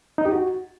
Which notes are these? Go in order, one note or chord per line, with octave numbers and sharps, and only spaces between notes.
D#4
G4
F#4